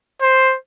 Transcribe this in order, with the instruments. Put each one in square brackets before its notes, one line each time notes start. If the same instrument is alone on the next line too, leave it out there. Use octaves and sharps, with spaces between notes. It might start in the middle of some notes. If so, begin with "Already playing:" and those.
[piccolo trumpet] C5